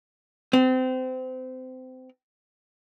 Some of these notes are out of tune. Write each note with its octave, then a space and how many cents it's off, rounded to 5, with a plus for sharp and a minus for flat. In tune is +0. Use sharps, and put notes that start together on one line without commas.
C4 -25